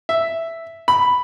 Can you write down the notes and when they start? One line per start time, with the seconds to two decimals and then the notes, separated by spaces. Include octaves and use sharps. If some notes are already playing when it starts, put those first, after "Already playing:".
0.09 E5
0.88 B5